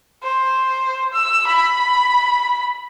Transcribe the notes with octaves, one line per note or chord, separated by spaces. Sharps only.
C5
E6
B5